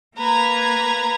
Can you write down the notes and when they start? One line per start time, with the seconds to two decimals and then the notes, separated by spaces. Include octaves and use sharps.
0.17 A#3 B4 A#5 G#6